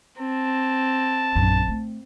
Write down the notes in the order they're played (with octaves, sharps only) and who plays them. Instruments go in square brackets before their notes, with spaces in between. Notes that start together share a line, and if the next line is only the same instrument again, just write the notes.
[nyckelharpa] C4 [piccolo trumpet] A5
[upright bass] A#1 F#2
A3